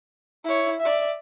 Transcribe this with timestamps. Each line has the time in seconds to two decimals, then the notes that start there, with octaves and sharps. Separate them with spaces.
0.44 E4 C#5
0.81 D5 E5